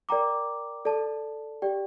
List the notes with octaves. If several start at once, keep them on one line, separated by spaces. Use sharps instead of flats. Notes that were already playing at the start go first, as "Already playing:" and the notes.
A#4 D5 G5 A#5 D6
A4 D5 A5
G4 D5 G5